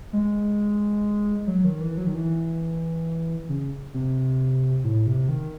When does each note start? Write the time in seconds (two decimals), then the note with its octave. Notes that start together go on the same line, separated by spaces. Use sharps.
0.13 G#3
1.47 F#3
1.65 D#3
1.81 E3
1.98 F#3
2.07 D#3
2.15 E3
3.49 C#3
3.94 C3
4.84 A2
5.07 C3
5.29 D#3